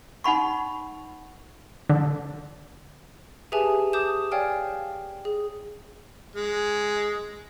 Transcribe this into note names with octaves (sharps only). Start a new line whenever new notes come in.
D#4 F#5 B5 C#6
D3
G4 G#4 B4 E5 G#5 A5
A5 D6 D#6 G6 E7
C#5 D5 F5 G5 G#5 F6
G#4
G#3